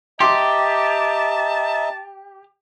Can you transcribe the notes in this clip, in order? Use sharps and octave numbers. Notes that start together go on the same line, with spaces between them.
G4 D#5 E5 A5 A#5 C6 D6